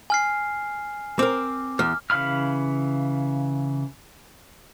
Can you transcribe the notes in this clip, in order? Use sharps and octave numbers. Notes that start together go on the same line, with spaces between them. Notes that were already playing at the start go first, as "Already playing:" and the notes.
G#5 F6 C7
C4 A#4 D6
E2 F6
C#3 E3 F5 B5 F6